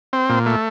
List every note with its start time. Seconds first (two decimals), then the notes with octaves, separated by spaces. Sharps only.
0.13 C4
0.30 A#2
0.46 A3